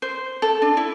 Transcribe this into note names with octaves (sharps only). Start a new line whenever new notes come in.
C5
A4
D4
E4